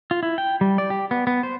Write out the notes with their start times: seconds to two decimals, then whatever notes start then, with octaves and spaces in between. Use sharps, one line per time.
0.11 F4
0.23 E4
0.38 G5
0.61 G3
0.78 D5
0.90 G4
1.11 B3
1.27 B3
1.43 C5